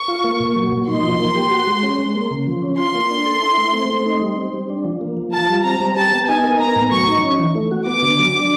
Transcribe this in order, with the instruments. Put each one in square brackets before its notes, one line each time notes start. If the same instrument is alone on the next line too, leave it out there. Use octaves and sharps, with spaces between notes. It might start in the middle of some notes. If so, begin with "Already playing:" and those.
Already playing: [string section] C#6
[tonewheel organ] F4
A#3
A#2
F#3
A#2
[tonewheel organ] D#4 [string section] C6
[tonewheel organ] F3
A#3
G4
F#4
G#3
C#4
G#3
A#3
C#3
F3
C#4
[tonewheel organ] F4 [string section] C6
[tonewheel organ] A#3
D4
A4
E4
A3
C4
A3
D#4
G3
C4
G3
D4
F3
A#3
F3
[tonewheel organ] F4 [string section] A5
[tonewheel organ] G3
[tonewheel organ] C4 [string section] A#5
[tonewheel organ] G3
[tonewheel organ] G4 [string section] A5
[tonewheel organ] B3
[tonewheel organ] D#4 [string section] G#5
[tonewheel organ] A#4
[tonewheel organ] B3 [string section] A#5
[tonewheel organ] A2
[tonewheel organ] F#3 [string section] C#6
[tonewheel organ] D#4
C#4
E3
A3
F#4
[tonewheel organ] B3 [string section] D6
[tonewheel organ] D3
F#3
D4